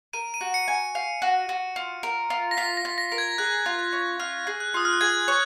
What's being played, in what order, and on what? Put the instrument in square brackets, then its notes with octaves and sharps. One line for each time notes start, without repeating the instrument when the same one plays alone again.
[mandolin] A#4 [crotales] D#7
[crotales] D#7
[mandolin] F#4
[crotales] C#7
[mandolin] G#5
[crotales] C#7
[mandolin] F5
F#4
F#4
F4
A#4
F4
[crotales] A#6
[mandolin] F4 [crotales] B6
[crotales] A#6
[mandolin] F4
[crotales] A#6
[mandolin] A#4
[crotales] G#6
[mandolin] G#4 [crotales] F#6
[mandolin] F4
[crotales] F#6
[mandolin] C#4
[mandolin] F4 [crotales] F6
[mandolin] G#4
[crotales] F#6
[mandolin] F4 [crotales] D#6
[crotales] F6
F#6
[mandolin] G#4 [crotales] G#6
[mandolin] C#5 [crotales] F#6